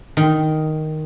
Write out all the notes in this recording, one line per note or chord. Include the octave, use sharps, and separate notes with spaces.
D#3